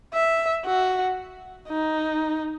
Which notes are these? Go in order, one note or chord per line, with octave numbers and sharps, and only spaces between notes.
E5
F#4
D#4